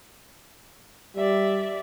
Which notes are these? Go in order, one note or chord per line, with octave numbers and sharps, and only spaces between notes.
G3 D5 E5